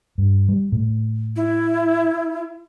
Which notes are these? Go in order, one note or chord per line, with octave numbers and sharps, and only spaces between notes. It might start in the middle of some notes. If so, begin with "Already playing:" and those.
G2
G3
A2
E4